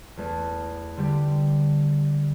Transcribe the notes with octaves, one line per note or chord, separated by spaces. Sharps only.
E2 A3 B3
D3 G3 G4